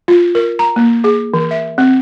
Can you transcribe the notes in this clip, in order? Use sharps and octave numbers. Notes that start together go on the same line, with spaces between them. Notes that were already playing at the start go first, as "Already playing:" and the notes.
F4
A#4
A#5
A#3
G#4
E3
E5
C4